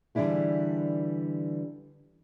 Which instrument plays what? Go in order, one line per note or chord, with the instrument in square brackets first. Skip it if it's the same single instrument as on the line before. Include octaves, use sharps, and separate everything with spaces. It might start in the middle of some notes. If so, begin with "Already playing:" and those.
[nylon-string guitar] D3 E3 G3 D4 E4 G#4